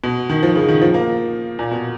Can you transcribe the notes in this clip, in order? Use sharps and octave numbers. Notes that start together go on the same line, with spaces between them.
B2
D#3
F3
C#3
D#3
F3
A#3
A#2
B2